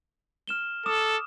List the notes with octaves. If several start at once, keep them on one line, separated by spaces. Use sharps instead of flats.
F6 E7 G7
A4 D6 D#6 E7